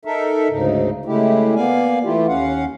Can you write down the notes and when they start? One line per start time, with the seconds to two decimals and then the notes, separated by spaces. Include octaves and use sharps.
0.05 D#4 A4 A#4 E5
0.50 D2 G#2 C#3 D#4
1.05 C#3 G#3 A3 E4 G4
1.55 A#3 B3 D5 F5 G#5
2.04 E3 A3 E4 F4 G4
2.28 D#2 C#4 F5 F#5